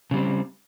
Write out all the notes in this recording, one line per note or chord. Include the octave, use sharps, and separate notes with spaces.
C#3 G3 C4